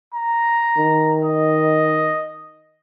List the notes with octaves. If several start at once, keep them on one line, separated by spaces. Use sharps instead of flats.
A#5
D#3
D#5